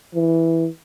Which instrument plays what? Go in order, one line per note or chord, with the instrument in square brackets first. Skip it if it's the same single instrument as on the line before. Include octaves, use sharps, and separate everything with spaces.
[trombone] E3